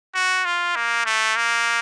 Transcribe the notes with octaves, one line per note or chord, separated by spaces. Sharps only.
F#4
F4
A#3
A3
A#3